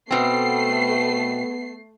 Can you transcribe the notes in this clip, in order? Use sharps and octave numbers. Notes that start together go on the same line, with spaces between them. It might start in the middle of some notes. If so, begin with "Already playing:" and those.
B2 A3 B3 C4 C7